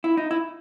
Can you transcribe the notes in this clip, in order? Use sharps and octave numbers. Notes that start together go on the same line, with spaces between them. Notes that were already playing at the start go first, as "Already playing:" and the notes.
E4
D#4
E4